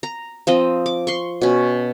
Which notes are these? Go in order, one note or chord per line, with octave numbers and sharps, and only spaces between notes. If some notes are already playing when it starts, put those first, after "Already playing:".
A#5
F3 C4 D#5
D6
C6 C#6
B2 C#4